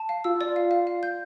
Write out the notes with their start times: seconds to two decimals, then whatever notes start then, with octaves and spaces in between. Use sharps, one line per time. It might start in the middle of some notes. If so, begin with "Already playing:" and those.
Already playing: A5
0.09 F5
0.24 F4 E6
0.35 F4
0.41 D5
0.46 F4
0.56 F5
0.71 F5
0.87 F5
1.03 G6